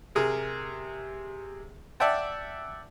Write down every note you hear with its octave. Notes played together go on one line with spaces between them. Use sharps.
C3 G#4 A#4
D5 E5 F#5 G5 A5